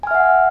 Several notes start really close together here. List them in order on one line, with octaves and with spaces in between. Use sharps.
G#5 F6 E5 F#5